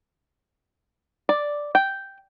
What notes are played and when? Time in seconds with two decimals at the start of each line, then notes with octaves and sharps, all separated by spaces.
1.29 D5
1.75 G5